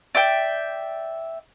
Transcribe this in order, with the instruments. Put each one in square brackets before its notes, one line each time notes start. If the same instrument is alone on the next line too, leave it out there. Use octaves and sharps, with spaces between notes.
[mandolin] D5 E5 G5